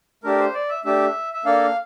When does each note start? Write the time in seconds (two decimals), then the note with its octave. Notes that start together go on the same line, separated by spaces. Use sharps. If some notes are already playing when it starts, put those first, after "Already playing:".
0.24 A3 D4 G4 A#4
0.39 C5
0.54 D5
0.69 E5
0.84 A3 D4 G4 E5
1.33 E5
1.44 A#3 D4 A4 F5